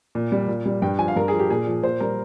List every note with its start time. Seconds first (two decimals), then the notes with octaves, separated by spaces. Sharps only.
0.15 A#2
0.32 G3
0.48 A#2
0.66 G3
0.82 G2 G5
0.99 F3 G#5
1.08 F5
1.16 G2 A#4
1.28 F3 G#4
1.39 G4
1.50 A#2 G#4
1.67 F3
1.84 A#2 C5
2.00 G3 A#4